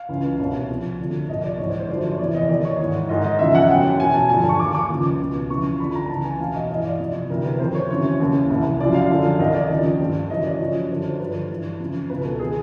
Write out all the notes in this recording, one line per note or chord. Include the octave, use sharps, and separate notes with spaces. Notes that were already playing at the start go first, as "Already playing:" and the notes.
Already playing: F5
C#2 C#3 E3
C2 B2 C#5
F2 C3 F3
D2 D3 F3
C2 A#2 F3 D#5
D5
G#2 E3 C#5
C5
C5
F#2 D3 F3 D5
C#5
E2 C3 E3 D5
D#5
D#2 D#3 D5
C#5
G#2 E3
G#2 D#3 D#5
D#5
E2 C#3 F3 E5
F#5
F#2 C#3 E3 G5
E2 B2 G#5
A5
G2 D3 F3 G#5
A5
C#6
D#2 D#3 D6
D6
C#2 C#3 F3
C#2 B2
F2 C#3 E3 C#6
F2 D3 F3 B5
A#5
C#2 C#3 E3 A5
G#5
E2 B2 F5
D#5
G2 E3 D#5
D5
F2 C3 F3
D2 C3 E3 A#4
B4
F2 C3 D#3 C5
C#5
F#2 C#3 E3 C#5
D#2 C#3 E3
C2 C3 E3
F#2 C#3 F3 D5
F5
F#2 D3 F3
C2 C3 D#3 D#5
D5
D#2 C#3 F3
G2 D#3
F#2 C#3 E3 D#5
D5
F#2 C#3 F3 C#5
F#2 D3 F3 C5
G2 D3 F3 B4
G2 E3
F2 C#3 E3
C#2 B2 B4
A4
D#3 G#4